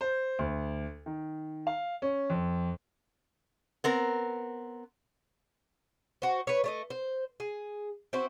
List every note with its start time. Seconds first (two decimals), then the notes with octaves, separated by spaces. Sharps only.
0.01 C5
0.39 D2
1.06 D#3
1.67 F5
2.02 C#4
2.30 F2
3.84 B3 C4 A#4
6.22 F#4 C5
6.47 B4 C#5
6.64 A3 C#5 D#5
6.90 C5
7.40 G#4
8.13 C4 E4 F#4 C5